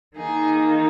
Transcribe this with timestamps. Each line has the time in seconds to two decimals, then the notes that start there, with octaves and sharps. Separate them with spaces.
0.16 D#3 A#3 D#4 G#4